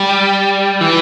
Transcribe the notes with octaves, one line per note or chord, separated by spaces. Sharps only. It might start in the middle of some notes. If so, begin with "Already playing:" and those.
Already playing: G3
E3